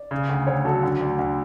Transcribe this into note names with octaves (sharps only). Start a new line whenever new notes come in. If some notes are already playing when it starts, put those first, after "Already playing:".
Already playing: D5
C#3
D2
D2 C#5
F#3 A4
D3
D2
D2